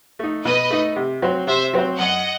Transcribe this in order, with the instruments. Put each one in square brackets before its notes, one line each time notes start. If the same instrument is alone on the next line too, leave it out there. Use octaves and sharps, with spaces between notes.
[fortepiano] A3 D#4
[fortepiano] B2 [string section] B4 D#5
[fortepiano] A3 D#4
C3
F#3 C4 F#4 C5
[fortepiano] C3 [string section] C5 E5
[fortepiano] F#3 C4 F#4 C5
[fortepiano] F#2 [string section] D#5 F#5